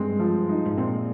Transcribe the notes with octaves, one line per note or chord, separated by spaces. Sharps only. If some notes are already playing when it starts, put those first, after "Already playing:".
Already playing: G2 G#3 C4
F3
D#4
G#2
A#2 C4